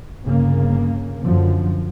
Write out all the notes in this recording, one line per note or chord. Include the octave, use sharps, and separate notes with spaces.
G1 C#3 A#3
F#2 D3 F3